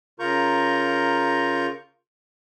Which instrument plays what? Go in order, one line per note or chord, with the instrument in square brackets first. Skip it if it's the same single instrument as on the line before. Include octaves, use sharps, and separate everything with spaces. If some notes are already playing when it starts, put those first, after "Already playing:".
[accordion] C#3 F4 A#4 A#5 C#6 G6